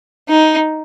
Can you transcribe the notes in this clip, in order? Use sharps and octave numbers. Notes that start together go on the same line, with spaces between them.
D#4